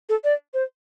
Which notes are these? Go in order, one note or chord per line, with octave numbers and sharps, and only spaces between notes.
A4
D5
C5